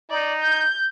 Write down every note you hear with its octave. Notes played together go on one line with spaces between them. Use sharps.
D#4 D5
G6